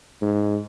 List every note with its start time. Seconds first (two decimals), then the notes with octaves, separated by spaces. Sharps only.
0.22 G#2